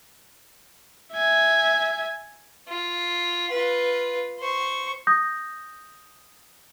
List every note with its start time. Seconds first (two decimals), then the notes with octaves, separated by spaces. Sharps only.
1.13 E5 G#5
2.68 F4
3.51 F4 B4
4.39 C5 C#6
5.07 D#6 G6 A#6